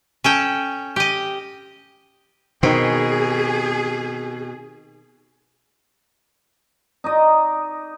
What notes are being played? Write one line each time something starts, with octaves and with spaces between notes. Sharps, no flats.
C#4 A4 G5
G4 D#5
B2 D#3 C4 G#4
D#4 D5 D#5